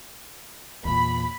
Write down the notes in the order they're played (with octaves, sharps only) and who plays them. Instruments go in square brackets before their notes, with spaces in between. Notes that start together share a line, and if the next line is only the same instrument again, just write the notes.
[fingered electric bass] E2 A#2 [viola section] B5